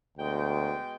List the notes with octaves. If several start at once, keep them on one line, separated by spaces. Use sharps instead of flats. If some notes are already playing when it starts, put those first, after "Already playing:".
D2 B2 G#3 G5